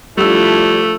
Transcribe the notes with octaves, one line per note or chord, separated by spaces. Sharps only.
F3 G3 A3 D4 E4 E6